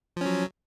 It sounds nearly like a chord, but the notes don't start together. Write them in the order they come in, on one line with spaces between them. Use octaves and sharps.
F3 C#4 F#3